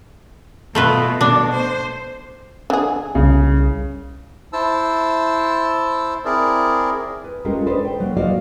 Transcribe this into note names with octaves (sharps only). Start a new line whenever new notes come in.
B2 A3 F4 B4
B2 D4
C5
D3 G#4
C2 C#3
E4 C5 A5 E6
C4 E4 G#4 A#4 D5
B4
G#3 C#4 F4 G4 A4 A#4
D4 A4 B4 C5 D5 D#5
G5
F#3 A#3
A#3 F#4 C5 D5 D#5 F5